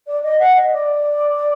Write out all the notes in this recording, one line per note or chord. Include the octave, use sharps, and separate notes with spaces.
D5
D#5
F#5
D#5
D5